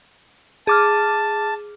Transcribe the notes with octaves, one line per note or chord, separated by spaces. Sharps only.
G#4 A5 D6 F6